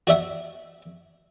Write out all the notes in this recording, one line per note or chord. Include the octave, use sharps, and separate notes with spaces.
F#4 D5 E5 F#5